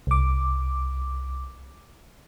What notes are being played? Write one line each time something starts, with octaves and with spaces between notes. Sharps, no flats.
C2 D6